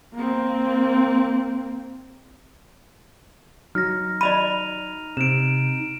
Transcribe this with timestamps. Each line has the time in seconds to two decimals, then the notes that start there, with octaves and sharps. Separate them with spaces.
0.14 A#3 C4
3.75 F#3 D#4 F6 A#6
4.21 D5 D#5 B5 D#7 F7
5.17 C3 D7 E7